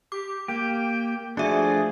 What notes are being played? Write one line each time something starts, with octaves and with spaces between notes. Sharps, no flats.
G4 D6
A#3 G4 G5
F3 A3 D4 F#4 G#4 D5 E5